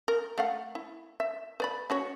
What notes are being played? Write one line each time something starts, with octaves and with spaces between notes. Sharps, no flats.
A#4
A3 F5 F#5
E4
E5
B4 D5 B5
C#4 F#4 C#5